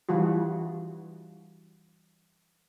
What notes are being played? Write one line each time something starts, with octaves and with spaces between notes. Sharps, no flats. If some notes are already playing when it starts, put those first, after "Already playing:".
E3 G3 F4 F#4